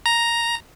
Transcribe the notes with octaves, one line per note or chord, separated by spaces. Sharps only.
A#5